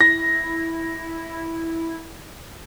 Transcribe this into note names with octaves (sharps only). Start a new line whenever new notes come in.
E4 A#6